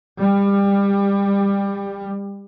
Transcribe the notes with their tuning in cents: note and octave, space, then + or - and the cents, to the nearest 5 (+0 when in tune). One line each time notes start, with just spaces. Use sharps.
G3 +25